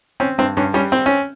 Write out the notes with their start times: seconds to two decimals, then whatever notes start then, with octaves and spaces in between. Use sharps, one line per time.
0.20 C4 C#4
0.38 G2 C4
0.57 G2 C#4
0.74 G3 C#4
0.92 C4
1.06 C#4